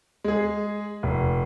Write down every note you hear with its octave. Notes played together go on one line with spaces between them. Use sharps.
G#3 G#4
F1